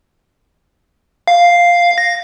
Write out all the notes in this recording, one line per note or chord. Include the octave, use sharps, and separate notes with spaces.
F5
A#6